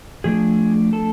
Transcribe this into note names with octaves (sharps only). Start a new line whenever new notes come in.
F2 F3 A3 D4 G#4
A4